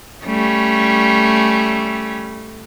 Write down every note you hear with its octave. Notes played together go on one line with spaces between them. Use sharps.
G3 A3 C#4